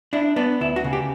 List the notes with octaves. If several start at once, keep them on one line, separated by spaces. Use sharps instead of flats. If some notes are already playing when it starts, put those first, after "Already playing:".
D4 E4
B3 D4
D2 E4
F#4
C#3
G4